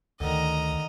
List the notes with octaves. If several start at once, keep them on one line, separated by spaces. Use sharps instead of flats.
D2 D3 D#3 D#5 A#5